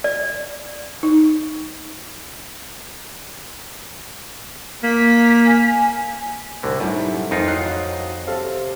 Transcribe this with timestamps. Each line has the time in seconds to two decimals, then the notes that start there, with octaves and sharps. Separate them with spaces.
0.04 D5
1.03 D#4
4.83 A#3 B6
5.47 G#5
6.63 C2 A2 D3
6.80 F#2 A2 D#3 G3 A3
7.31 F2 G#2 D#3 E3 D#4 F4
7.48 F#3 D#5 F#6 C7
8.27 C3 A4 F5